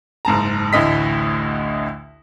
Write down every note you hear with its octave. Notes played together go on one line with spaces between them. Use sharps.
F#1 G#2 A5 A#5
A1 D2 A2 D3 D#5 B6